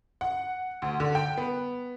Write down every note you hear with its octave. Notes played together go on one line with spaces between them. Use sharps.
F#5
D2
D3
G5
B3